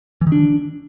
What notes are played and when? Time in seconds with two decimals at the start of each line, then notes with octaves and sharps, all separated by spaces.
0.21 E3
0.27 D#3
0.32 D4